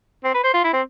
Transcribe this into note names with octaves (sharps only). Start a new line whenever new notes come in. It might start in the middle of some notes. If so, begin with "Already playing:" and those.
C4
B4
C5
F4
E4
C4